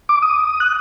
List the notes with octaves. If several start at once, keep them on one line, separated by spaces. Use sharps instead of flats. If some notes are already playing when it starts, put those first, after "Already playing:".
D6
D#6
F#6